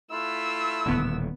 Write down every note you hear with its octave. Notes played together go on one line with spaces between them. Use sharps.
A3 E4 F4 E6
D#1 A2 D3 B3